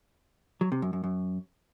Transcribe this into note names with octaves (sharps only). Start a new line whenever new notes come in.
F#3
C3
F#2
F#2
F#2